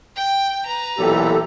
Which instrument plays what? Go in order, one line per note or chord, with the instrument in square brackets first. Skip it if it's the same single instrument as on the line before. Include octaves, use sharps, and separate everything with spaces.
[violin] G5
B4 A#5
[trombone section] B1 A#2 E3 [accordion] G4 A4